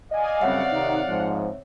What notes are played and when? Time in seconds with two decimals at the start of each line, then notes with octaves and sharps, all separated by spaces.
0.11 D5 D#5 F5 G#5
0.41 F#2 C#3 G3 C4 C#5 E5 F#5
0.72 C3 D#3 D#4
1.08 G#2 F3